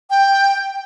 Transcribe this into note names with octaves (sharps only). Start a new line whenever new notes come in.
G5